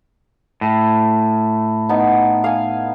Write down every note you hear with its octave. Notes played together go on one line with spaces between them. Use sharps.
A2
B3 D#4
F5 G#5